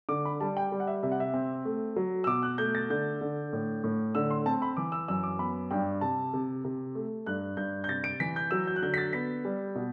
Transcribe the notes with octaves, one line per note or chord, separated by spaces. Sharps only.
D3 D6
B5
G3 A5
G5
G3
F#5
E5
C3 E5
F#5
E5
C4
A3
F#3
E6
B2 D6
F#6
A3 G6
A6
D3 G6
D3
A2
A2
D3 E6
C6
C4 A5
B5
E3 D6
E6
F#2 E6
D6
B3 B5
G2 G5
C3 A5
C3
C3
A3
G2 F#6
G2 G6
G6
C3 A6
D7
E3 B6
G6
F#3 E6
G6
F#6
D3 G6
B6
A6
B3 B6
G3
B2